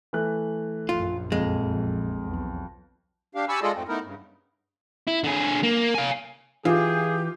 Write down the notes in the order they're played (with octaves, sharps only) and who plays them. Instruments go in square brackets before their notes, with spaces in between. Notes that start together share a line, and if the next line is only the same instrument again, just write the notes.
[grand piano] E3 A3 F#6
[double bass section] A#1 F#2 [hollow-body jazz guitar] F4
[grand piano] F2 [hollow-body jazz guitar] G#3
[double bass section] B1 E2
[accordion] D4 G4 F5
G4 G#5 A5 B5 C#6 E6
G#3 F4 G#4 A4 D5 D#5
F2 G#2 A3 C4
A3 B3 D#4 E4 A#4
G2 C#3
[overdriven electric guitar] E4
D3 G#4
A#3
F5 G#5
[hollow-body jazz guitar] E3 [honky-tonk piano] F4 [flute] G4 [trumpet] G#4